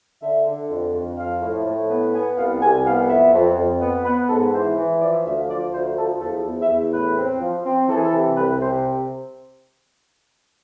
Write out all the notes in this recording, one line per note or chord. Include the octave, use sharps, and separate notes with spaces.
D3 E5
D3
F2
F2
F3 F5
A2
A2
B3
B3 G#5
C2 F5
C2 G#5
B3 F5
F2 E5
F2
F2
B3
B3 B4
G#2 A4
E3 C5
E3
F3 D5
E5
D2 E5
F5
F3 D5
D2 C5
F3 A4
E2 A4
E2
E5
E2
A2 B4
C4
F3
C4
E3 A4
G#4
A4
C3
C2 B4
C3 C5